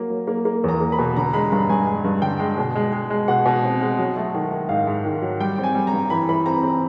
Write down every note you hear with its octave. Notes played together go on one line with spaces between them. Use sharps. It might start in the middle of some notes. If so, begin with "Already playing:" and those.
Already playing: F#3 A#3
F#3
A#3
A#3
E2 A#5
A#3
B5
B2
D3 A#5
G#3 B5
G2 A#5
G2 G#5
G#3
G2
D3 G5
G#3
B2
G#3
G#3
G#3
B2 F#5
B2
C4
G#3
F#3
A3
D#3
D#3
G#2 F5
G#2
D#3
F#3
G3 G5
C4
G#5
G3
A#5
G2
E3 B5
E3 B5
C4 A#5
C4